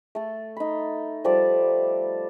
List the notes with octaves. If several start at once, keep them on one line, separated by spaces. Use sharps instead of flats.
A3 A4
D#4 B5
F3 G3 A4 D5